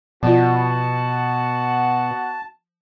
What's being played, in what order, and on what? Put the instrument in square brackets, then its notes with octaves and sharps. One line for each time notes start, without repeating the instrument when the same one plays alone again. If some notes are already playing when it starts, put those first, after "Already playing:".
[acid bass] B2 [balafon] F3 F4 [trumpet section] B3 F#4 F#5 [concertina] A5